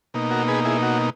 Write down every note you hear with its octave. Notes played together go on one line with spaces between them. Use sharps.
B2 A#3 D#4
F#4 A#4
G#4 B4
E4 G#4
F#4